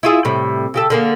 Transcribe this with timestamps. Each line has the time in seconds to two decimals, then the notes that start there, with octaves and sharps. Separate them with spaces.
0.03 E4 F4 G#4
0.25 A2 C3 G3
0.74 C#3 G4 A4
0.90 D3 A#3 G#4